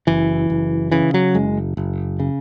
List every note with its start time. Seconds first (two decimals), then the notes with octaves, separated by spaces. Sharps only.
0.07 F#1 E3
0.50 F#1
0.92 C#3 E3
1.14 F#3
1.35 F#1 G#3
1.77 F#1
2.20 C#3